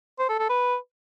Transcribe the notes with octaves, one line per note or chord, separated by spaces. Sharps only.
C5
A4
A4
B4